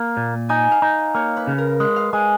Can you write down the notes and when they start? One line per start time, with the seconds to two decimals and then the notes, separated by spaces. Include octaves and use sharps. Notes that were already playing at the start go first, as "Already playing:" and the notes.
Already playing: A#3
0.17 A#2
0.49 D#4 G#5
0.72 F5
0.82 D#4
1.15 A#3 C#5
1.37 B4
1.47 C#3
1.58 A#4
1.80 G#3 B4
1.96 F5
2.13 G#3 G#5